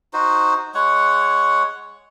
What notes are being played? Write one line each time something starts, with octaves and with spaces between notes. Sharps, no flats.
D#4 F#4 C5
G#3 C#5 F#5 C#6